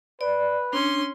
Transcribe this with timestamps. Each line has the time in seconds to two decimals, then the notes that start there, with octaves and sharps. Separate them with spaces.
0.21 B4 D5
0.73 C#4 D4 C6